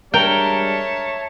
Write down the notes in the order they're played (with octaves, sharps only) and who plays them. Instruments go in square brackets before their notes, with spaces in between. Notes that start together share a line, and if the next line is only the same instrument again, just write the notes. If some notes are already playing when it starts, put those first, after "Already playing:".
[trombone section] G3 G#3 D4 [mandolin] A#4 [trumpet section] C#5 E5 A5 [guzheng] G5